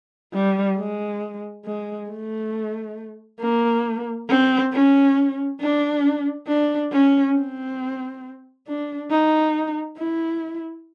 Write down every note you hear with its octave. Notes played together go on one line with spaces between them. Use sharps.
G3
G#3
G#3
A3
A#3
C4
C#4
D4
D4
C#4
C4
D4
D#4
E4